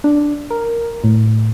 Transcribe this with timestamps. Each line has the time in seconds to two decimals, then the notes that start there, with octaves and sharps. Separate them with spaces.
0.04 D4
0.50 A#4
1.04 A2